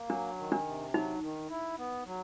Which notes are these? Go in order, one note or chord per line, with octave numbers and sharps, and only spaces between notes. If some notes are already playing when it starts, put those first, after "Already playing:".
Already playing: A#3
F#3 D4
D#3
D4
C3
F#3 D#4
D#3
E4
B3
F#3